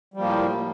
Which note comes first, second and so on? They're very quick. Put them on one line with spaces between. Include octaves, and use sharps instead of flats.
G3 F3 A#3 A2